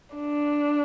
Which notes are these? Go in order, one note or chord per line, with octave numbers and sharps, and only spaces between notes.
D4